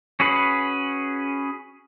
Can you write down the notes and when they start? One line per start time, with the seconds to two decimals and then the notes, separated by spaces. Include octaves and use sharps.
0.20 C#4 F#4 G#4 B4